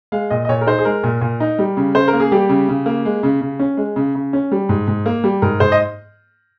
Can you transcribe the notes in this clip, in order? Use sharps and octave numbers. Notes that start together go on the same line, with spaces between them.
G#3 F5
A#2 D#5
D#5
A#2 C#5
A#4
D#4 C5
G#4
G#3 A#4
A#2
A#2
D#4
G3
C#3
C#3 C5
A#4
A#3
G#4
G3 G4
C#3
C#3
A#3
G#3
C#3
C#3
C#4
G#3
C#3
C#3
C#4
G3
G#2
G#2
A#3
G3
G#2 A#4
G#2 C5
D#5